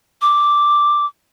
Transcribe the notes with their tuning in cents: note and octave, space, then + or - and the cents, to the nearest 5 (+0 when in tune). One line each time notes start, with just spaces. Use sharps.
D6 +0